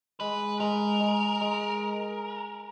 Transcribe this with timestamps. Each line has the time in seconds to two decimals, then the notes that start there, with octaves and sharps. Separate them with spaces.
0.20 G#3 B4
0.60 G#3 A#4
1.00 G#3
1.41 G#3